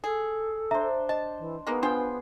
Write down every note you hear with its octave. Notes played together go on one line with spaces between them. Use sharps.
G#4 A4
D4 C5 E5 A#5
D#5 A5
E3
G#3 A#3 B3 D#4
D4 F4 G#4 B4 C5 G5